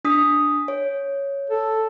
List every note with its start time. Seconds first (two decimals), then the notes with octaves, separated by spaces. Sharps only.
0.05 D4 D#6 B6
0.68 C#5
1.50 A4